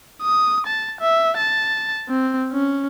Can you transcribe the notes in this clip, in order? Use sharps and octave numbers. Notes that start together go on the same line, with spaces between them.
D#6
A5
E5
A5
C4
C#4